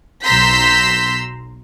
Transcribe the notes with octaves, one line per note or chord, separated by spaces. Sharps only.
B1 A#5 C6 E6 G6 B6